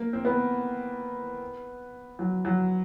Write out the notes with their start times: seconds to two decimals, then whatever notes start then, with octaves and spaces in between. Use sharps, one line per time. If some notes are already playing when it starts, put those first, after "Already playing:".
Already playing: A#3
0.13 C4
0.25 B3
2.19 F#3
2.45 F#3